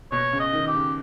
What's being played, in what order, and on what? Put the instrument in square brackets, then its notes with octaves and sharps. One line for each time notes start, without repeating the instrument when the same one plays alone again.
[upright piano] B2 [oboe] C#5
[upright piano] C#3
[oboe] D#5
[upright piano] D#3
[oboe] G4
[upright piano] C#3